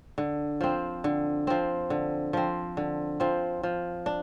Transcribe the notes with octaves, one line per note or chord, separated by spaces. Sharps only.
D3
F3 C4
D3
F3 C4
D3
F3 C4
D3
F3 C4
F3
D4